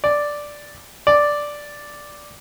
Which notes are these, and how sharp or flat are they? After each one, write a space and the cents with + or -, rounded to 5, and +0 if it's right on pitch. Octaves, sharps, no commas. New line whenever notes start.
D5 +0
D5 +0